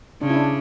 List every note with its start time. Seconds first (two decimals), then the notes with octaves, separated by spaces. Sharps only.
0.22 C#3 D4
0.30 E4
0.36 D4